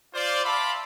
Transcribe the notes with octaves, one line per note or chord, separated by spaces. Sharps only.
F4 C5 D5
E5 F5 A5 B5 C6 D6